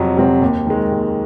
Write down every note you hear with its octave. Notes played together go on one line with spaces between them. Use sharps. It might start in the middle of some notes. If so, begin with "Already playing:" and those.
Already playing: F2 C3 F#3 C4 F#4
C3 F#3 C4 F#4
D#2
D#3 G#3
D#2